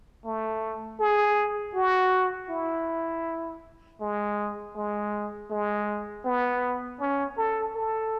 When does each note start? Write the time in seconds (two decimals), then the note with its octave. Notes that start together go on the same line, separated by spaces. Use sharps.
0.25 A3
1.00 G#4
1.75 F#4
2.49 E4
4.00 G#3
4.75 G#3
5.50 G#3
6.25 B3
7.00 C#4
7.37 A4
7.75 A4